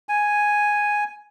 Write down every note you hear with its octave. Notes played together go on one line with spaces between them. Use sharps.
G#5